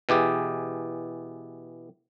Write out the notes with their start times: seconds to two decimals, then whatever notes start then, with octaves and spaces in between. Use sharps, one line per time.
0.09 B2 E3 G4 G#4